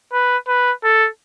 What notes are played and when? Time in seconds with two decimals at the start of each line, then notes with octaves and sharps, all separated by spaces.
0.13 B4
0.48 B4
0.84 A4